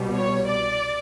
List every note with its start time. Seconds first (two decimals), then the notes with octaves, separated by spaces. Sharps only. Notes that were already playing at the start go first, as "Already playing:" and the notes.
Already playing: C2 B2 G3
0.15 C#5
0.48 D5